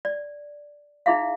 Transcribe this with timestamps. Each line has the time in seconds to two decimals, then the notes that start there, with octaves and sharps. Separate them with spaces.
0.05 D5
1.06 D#4 E4 G#4 E5 F5